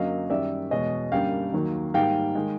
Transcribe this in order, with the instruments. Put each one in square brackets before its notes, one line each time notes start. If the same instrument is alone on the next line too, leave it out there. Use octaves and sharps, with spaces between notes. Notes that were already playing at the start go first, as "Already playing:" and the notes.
Already playing: [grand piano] F#2 D3 F#3 A#3 D#5 F5
F#2 D#3 G3 D5 E5
E2 B2 G#3 C#5 D#5
F#2 D3 G3 A#3 F5 G5
D#2 D#3 F#3 A#3
G#2 D#3 G3 A#3 F5 G5
D#3 G#3